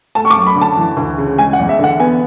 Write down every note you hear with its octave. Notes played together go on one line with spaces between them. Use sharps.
A3 A5
C#6
D6
F#2
B5
D3
A5
E3
D2
C#3
G#3 G#5
F#5
E2
E5
D3 F#5
B3 G#5